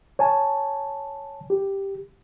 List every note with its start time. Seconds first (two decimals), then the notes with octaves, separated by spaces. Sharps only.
0.19 C#5 G#5 A5
1.50 G4